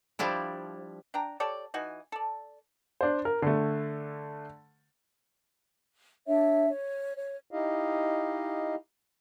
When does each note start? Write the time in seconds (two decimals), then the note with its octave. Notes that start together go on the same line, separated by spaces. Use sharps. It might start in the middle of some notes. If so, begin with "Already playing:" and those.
0.19 F3 G3 D4 E4
1.14 D4 G5 A#5
1.40 G4 A4 C#5 D5
1.74 E3 D#4 F#4 G#5
2.12 A4 D5
3.01 D4 C5
3.25 A#4
3.42 D3 A3
6.26 D4 C#5 E5
6.70 C#5
7.16 C#5
7.51 D#4 E4 G4 D#5 F5